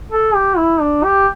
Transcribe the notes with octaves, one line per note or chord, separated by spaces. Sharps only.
A4
G4
E4
D4
G4